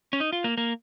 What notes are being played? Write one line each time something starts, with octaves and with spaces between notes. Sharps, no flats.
C#4
D#4
F4
A#3
A#3